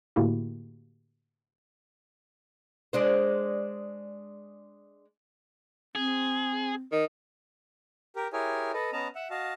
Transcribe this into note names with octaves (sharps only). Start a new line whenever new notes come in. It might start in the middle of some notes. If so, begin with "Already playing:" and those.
A2 D3 A#3 E4 F#4 G4
G#3 D4 C5
C4 G#4
D#3
G4 A#4
E4 G4 G#4 A#4 C#5 G#5
A4 B4 D#5
B3 C#4 D#5 A5 A#5
E5 F#5
F#4 D#5 F5 A5